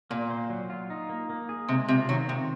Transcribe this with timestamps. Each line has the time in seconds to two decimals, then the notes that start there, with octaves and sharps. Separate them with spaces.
0.11 A#2 A#3
0.30 C5
0.50 F#3
0.70 F4
0.90 D#4
1.09 A#3
1.30 A#3
1.49 G#4
1.68 C3 G#3
1.88 C3 F4
2.09 D#3 F#3
2.28 C3 C4